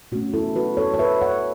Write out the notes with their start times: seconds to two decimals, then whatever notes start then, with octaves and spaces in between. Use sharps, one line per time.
0.12 B2 A3 C#4 F#4
0.33 E4 A4
0.56 F#4 B4
0.77 A4 C#5
0.94 C#5
0.99 B4 E5
1.22 C#5 F#5